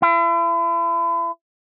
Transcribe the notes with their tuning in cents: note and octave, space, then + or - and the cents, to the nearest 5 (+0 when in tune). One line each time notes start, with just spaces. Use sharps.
E4 +40